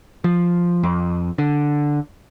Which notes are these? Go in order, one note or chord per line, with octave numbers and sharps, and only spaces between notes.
F3
F2
D3